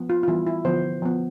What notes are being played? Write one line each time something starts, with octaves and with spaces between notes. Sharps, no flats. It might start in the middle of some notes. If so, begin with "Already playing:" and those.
Already playing: F3 B3
F4
F4
E3 G3 B3 E4
E4
D3 F3 B3 C5
F3 B3